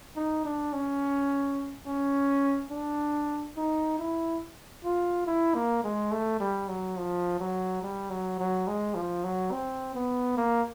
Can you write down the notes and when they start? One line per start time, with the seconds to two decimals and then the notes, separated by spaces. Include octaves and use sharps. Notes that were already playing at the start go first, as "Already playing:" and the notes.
0.16 D#4
0.45 D4
0.73 C#4
1.86 C#4
2.71 D4
3.56 D#4
3.99 E4
4.84 F4
5.26 E4
5.54 A#3
5.84 G#3
6.12 A3
6.40 G3
6.68 F#3
6.97 F3
7.40 F#3
7.82 G3
8.10 F#3
8.39 F#3
8.67 G#3
8.95 F3
9.24 F#3
9.52 C4
9.95 B3
10.37 A#3